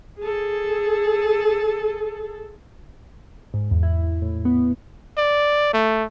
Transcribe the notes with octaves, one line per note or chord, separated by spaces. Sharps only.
G#4 A4
G#2
E2
E4
A2
B3
D5
A3